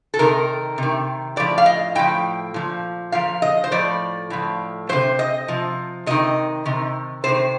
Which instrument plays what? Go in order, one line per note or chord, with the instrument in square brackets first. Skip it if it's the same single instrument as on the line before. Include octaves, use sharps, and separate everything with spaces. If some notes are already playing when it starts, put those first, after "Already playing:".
[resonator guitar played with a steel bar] A4
C3 D#3 A#4
C3 D#3
A2 F3 D5
F5
D#5
A2 F3 G5
A#2 F3
A#2 F3 F5
D#5
C5
A2 F3 D5
A2 F3
C3 F3 C5
D#5
C3 F3
C3 D#3 D#5
C3 D#3
C3 D#3 C5